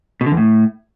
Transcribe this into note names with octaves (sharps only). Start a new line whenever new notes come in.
B2
D3
E2
A2